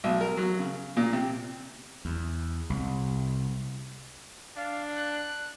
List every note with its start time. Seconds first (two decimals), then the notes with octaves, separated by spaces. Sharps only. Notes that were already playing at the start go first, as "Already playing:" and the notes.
0.04 B1
0.21 A#4
0.37 F#3
0.59 C#3
0.97 A#2
1.13 C3
2.05 E2
2.70 C2
4.57 D4 F5
4.96 F#6